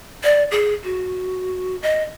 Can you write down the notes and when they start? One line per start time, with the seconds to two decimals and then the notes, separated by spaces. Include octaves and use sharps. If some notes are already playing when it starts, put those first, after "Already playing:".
0.23 D5
0.51 G#4
0.84 F#4
1.82 D#5